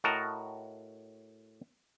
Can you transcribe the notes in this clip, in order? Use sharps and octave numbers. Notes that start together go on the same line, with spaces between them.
A2 F#4 A#4 D#5 A5 A#5